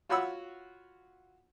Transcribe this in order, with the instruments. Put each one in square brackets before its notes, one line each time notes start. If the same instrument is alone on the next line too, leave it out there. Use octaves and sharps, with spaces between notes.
[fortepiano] F4 F#4 C#5 F#5 B5 E6